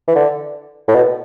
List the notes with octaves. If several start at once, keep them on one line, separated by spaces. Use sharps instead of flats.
E3
D3
A2
B2